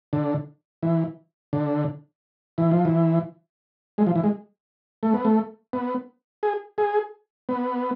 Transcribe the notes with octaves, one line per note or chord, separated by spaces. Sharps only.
D3
E3
D3
E3
F3
E3
G#3
F3
E3
G#3
A3
B3
A3
B3
G#4
G#4
B3